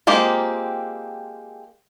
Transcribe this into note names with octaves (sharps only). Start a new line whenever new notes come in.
G#3 A#3 C4 F4 G4